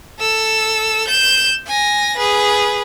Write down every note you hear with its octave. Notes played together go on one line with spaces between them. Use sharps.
A4 E6
G6 E7
G#5 A#6
G#4 B4